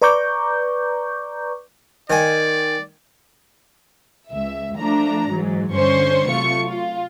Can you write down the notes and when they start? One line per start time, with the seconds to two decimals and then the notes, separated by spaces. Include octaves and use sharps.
0.02 B4 D5 A#5 C#6 D6 G6
2.10 D#3 D5 G#5
4.32 C#2 E5
4.78 F3 A3 D4 A#5
5.30 G#2 E3 F#3
5.73 G2 D3 C#4 C5 C6 C#6
6.29 C3 F#3 A3 F4 C#6 C#7
6.67 F4